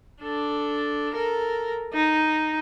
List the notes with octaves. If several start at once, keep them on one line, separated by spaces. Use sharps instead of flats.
D4 A4
A4 A#4
D#4